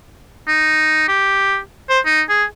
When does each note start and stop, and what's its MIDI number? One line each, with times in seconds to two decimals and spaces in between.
0.48 1.03 63
1.08 1.57 67
1.89 2.00 72
2.06 2.21 63
2.29 2.44 68